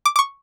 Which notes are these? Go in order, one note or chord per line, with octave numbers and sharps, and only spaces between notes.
D6
D6
C#6